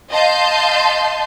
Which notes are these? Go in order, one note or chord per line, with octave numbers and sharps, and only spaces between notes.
D#5 F5 A5 C6 G6